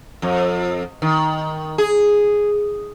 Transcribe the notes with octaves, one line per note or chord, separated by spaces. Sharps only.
F2
D#3
G#4